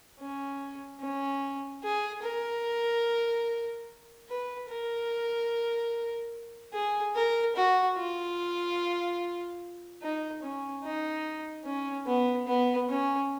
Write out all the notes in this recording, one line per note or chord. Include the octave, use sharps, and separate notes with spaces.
C#4
C#4
G#4
A#4
B4
A#4
G#4
A#4
F#4
F4
D#4
C#4
D#4
C#4
B3
B3
C#4